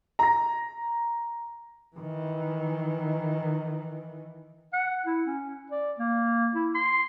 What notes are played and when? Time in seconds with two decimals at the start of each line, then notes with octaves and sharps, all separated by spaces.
0.19 A#5 A#6
1.96 D#3 E3
4.73 F#5
5.06 E4
5.27 C#4
5.71 D5
5.99 A#3
6.55 E4
6.75 C6